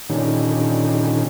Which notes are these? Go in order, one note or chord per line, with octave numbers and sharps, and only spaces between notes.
A#2 D3 D#3 C#4 D#4 G4